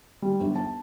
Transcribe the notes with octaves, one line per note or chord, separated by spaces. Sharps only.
G3
G1
A5